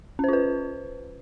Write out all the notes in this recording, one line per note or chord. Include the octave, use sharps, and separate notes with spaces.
C#4 F4 B4 C5